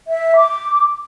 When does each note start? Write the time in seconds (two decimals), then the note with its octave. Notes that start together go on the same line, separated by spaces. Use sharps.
0.08 E5
0.36 D6